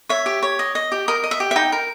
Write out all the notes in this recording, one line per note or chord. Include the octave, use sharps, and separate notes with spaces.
C#5 E5
G4
C#5
D#5
D#5
G4
A#4 D#5
D#5
E5
G4
E5
D#4 G5
A#4